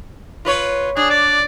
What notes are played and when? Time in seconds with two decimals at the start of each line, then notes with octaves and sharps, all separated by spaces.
0.45 F4 B4 C#5
0.97 D4 G#4
1.10 D5